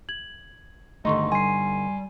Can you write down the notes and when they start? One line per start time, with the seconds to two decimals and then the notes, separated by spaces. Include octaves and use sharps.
0.09 G#6 F#7
1.05 G1 D3 D#3 A3 D#4 D#5 C6 C#6
1.32 G3 G#5 C6 C7